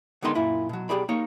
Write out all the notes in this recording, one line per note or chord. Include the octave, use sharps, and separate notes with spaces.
D3 D#3 G#3 B3 D#4 C6
F#2 A#2 E4
B2 F#3
B1 G3 G4 G#4 D5 B5
A#3 D#4 C#5